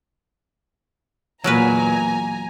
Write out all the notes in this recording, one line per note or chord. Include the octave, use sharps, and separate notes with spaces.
E2 A#2 F#3 A#4 B4 G#5 A#5